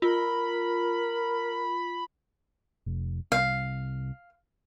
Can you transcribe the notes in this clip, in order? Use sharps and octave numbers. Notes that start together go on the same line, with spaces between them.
F4 A#4 B5
F1
C2 F5